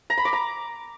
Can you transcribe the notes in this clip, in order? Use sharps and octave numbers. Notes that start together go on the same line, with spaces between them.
A#5
B5
D6
A#5